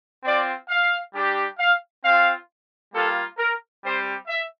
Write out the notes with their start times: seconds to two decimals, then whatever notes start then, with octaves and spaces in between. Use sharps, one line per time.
0.24 C4 F4 D5
0.69 F5
1.13 G3 D4 G4
1.58 F5
2.03 C4 F4 F5
2.93 G3 A#3 F4 A4
3.37 A#4
3.83 G3 C4 G4 C5
4.27 E5